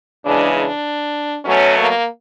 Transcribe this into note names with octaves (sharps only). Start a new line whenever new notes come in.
E2 C#3 E3 G#3 D4
D4
B2 F#3 A3 C#4
A#3